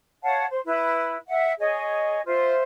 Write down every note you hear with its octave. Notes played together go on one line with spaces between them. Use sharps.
C#5 F5 F#5 A5
C5
E4 B4
E5 F#5
G#4 C#5 D#5
F4 C5 E5